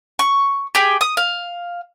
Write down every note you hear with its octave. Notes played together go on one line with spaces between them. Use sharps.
C#6
G4 G#4 G5
D#6
F5